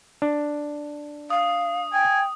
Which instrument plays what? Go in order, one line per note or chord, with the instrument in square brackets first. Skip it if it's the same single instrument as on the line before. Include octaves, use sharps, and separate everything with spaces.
[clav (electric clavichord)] D4
[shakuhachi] F5 [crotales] D#6
[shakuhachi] G5 [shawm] G#5